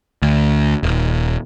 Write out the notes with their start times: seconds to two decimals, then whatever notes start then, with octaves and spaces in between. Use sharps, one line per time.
0.22 D2
0.83 D#1